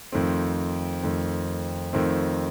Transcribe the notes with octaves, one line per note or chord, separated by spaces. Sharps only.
F2 D#3 A3 C4
F2 D#3 A3 C4
F2 D#3 A3 C4